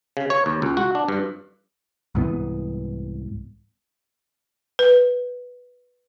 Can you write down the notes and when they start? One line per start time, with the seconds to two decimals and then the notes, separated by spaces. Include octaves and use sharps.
0.17 C#3
0.30 C#5
0.46 D#2
0.62 C#2
0.77 F#4
0.95 D4
1.08 G2
2.15 C2 G#2 E3 B3
4.79 B4